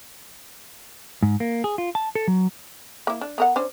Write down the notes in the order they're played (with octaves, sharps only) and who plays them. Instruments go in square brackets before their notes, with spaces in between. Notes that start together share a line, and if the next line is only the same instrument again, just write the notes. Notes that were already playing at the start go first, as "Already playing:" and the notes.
[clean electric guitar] G#2
A#3
G#4
F4
A5
A4
F#3
[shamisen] A#3 E4
D4
B3 A#4 F#5
C#4 D4 C5